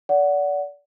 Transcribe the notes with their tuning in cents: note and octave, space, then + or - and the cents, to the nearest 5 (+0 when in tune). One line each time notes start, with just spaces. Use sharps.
D5 -30 F#5 +0